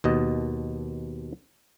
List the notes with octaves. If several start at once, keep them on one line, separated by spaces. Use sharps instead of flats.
D#2 B2 D#5